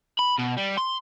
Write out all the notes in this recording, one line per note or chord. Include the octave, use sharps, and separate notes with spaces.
B5
B2
G3
C6